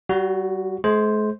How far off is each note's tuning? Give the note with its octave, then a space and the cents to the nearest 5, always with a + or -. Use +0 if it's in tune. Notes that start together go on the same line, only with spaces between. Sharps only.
G3 -35 F#4 +0
G#3 +45 C5 +0